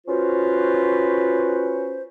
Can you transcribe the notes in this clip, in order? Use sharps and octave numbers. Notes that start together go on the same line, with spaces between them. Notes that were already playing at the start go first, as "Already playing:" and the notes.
C#4 F4 F#4 B4 C5